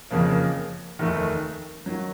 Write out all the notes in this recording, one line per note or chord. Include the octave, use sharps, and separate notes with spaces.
F#1 F2 C#3 F3 A#3
F1 D#2 D#3 A3
D#3 F#3